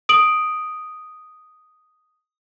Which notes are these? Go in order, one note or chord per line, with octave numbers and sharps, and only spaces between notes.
D#6 D7 F#7